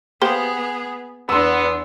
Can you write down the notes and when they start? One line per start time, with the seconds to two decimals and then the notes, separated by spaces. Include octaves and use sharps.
0.21 A#3 B3 G4 G#4 C5
1.29 E2 B3 D4 C6 E6